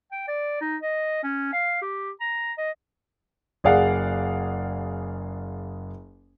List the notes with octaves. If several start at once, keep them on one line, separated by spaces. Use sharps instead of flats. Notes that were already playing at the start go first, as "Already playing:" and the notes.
G5
D5
D#4
D#5
C#4
F5
G4
A#5
D#5
F#1 G#4 D5 F5 F#5